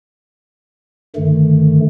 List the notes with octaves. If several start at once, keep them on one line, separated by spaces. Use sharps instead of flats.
G2 D3 D#3 A3